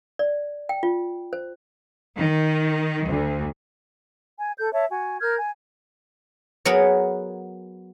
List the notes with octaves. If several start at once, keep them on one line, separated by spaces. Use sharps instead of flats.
D5
G5
F4
C5
D#3
D2
G#5
A4 G6
C#5 E5 A5
F#4 G#5
A#4 F6 G6 G#6
G#5
F#3 B3 G#4 A#4 B4 C#5